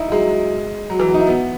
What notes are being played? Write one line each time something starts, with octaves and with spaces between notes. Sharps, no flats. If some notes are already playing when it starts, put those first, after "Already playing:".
Already playing: D#4 E4
F#3
G#3
F#3
E3
F#3
D#4
E4
B3